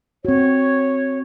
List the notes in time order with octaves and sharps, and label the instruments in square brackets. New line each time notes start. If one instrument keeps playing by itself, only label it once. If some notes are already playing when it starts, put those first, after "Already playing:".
[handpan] C4 F#4 [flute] C#5